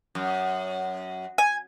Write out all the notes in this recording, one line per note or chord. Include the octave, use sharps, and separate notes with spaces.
F#2
G#5